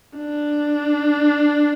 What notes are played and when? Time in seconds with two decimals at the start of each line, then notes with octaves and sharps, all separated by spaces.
0.17 D4